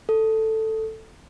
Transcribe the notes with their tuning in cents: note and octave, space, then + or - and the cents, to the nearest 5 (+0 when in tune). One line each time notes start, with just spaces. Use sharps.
A4 +5